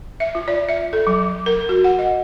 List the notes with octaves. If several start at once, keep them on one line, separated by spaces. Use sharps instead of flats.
E5
F4
D5
E5
A4
F#3
A#4
F#4
F#5
D#5